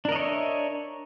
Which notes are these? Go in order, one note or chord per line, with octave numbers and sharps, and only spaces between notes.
D4 A#4 C#5 D#5 E5